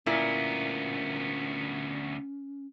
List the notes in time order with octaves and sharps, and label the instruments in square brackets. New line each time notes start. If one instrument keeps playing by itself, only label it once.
[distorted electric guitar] D2 B3 [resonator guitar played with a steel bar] A#2 E4 A#4 [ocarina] C#4